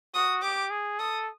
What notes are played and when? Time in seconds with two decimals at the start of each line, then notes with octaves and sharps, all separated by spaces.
0.15 F#4 D#6
0.42 G4 D6
0.71 G#4
0.99 A4 D#6